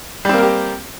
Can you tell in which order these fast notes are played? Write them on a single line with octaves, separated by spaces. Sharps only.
G3 C4 A#3 A#4 G4